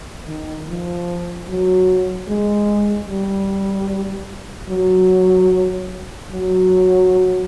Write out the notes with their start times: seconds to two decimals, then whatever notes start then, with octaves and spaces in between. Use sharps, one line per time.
0.28 D#3
0.68 F3
1.49 F#3
2.28 G#3
3.09 G3
4.70 F#3
6.32 F#3